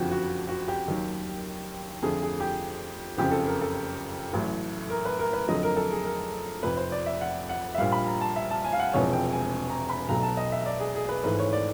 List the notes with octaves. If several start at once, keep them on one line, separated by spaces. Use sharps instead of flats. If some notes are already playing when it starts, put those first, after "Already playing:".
Already playing: F#1 F2 D3 F3 F#4 G4
F#4
F#4
G4
D#2 D#3 F#3
F2 D3 F3 A3 G#4
G#4
G4
F#1 F2 C#3 G4
A4
A#4
A4
A1 A2 F#3
A#4
B4
A#4
B4
F2 D3 F#3 A3 D#5
A#4
A4
G#4
A#4
F1 F2 C3 B4
C5
D5
E5
F#5
F#5
E5
A#1 A#2 G3 F5
B5
A#5
A5
E5
A5
G#5
F5
F#5
E1 E2 C3 F3 G#3 C#5
G5
G#5
A#5
B5
B1 B2 F#3 A3 A#5
A5
D#5
E5
D5
G#4
G#4
B4
G#1 G#2 E3 A3 B4
C#5
D5